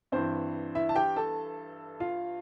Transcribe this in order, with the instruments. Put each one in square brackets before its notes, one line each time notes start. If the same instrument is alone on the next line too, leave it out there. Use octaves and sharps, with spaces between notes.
[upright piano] G2 E3 C4 C5
E4 E5
A5
G4 G5
A4 A5
F4 F5